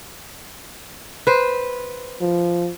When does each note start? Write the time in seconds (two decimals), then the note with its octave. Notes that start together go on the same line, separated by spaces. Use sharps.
1.27 B4 C5
2.21 F3